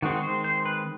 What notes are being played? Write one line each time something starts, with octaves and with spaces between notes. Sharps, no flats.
D#3 G#3 C4 F#4
C5
C5
B4